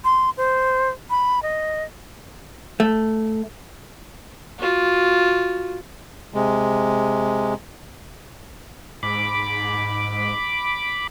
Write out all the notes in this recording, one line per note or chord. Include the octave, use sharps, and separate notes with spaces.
C6
C5
B5
D#5
A3
F4 F#4
C3 G#3
G#2 B5 D6